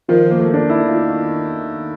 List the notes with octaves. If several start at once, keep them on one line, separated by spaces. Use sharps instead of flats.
D#3 F3
A#3
A3
D4
D#3 E4
F4